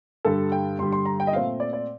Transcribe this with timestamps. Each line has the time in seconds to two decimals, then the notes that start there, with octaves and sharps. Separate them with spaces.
0.25 G2 D3 G3 A4
0.52 G5
0.79 G2 D3 G3 C6
0.92 C6
1.05 A#5
1.20 G5
1.27 D#5
1.33 A#2 A3 C4 F5
1.60 D5
1.73 D5